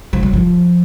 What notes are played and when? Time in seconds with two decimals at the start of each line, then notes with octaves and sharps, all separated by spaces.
0.13 F3
0.23 F#3
0.33 F3